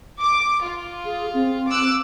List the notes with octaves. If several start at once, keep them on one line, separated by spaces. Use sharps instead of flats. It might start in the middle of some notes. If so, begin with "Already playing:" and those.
D6
F4
G#4
C4
D6 E6 F#6